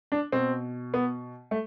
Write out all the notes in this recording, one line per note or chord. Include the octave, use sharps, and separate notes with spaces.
D4
B2 C4
B3
A3